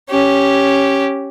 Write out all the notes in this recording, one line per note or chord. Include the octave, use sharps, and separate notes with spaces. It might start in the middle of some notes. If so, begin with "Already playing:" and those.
C#4 G4